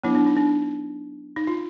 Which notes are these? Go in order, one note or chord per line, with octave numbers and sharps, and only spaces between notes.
F#3 B3 D4 E4
D4
D#4
D4
D#4
F4